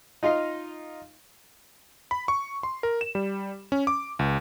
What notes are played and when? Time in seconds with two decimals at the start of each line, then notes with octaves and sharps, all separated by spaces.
0.23 D#4 F4 D#5 F5
2.11 B5
2.28 C#6
2.63 C6
2.83 A#4
3.01 E7
3.15 G3
3.72 C#4
3.87 D6
4.19 C#2